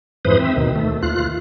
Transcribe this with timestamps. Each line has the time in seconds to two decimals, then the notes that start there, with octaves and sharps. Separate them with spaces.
0.25 F2 G#2 E3 B4 C5 D#6
0.39 C4 E5
0.56 D#2 B2 D#3
0.76 A3
1.03 D#2 F4 F#6